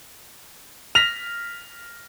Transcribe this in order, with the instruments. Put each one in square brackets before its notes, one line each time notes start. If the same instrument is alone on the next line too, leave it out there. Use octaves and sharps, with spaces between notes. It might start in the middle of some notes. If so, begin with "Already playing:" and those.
[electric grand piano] F6 A#6 B6 [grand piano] F7